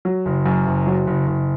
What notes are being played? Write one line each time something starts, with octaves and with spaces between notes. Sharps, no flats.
F#3
F#1
F#2
F#1
F#3
F#1
F#1